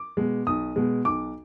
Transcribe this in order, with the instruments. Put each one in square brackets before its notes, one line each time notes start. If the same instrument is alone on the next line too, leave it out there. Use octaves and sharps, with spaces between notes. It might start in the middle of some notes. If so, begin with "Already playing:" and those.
Already playing: [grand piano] D6
B2 G#3
B1 D#6
B2 G#3
B1 D6